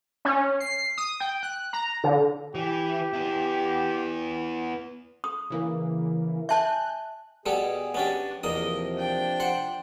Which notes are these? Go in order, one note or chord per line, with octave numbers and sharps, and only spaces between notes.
C#4
C7
D#6
G5
F#6
A#5
D3
E3 G4
B3 E4
D#6
C#3 E3 A#3
E5 G#5 A5 F#6 G6
B2 G3 B3 G#4 A4
B3 C#4 D4 G4
E2 C3 F3 A#3 D#5 D#6
D4 G5
C5 F#5